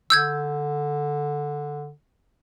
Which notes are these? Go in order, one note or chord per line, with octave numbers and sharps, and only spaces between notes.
D3 E6 G6 G#6